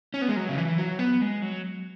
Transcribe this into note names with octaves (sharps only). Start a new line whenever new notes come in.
C#4
B3
G#3
F#3
C#3
E3
F#3
B3
G#3
F#3